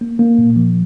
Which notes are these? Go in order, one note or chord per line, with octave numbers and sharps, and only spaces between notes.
A#3
A#3
A#2
F3